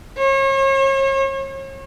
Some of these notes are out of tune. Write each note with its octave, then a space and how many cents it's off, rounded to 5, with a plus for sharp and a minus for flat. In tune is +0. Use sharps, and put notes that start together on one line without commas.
C#5 -40